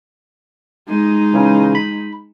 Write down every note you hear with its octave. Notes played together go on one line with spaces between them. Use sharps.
G#3 D#4
C#3 E3
B5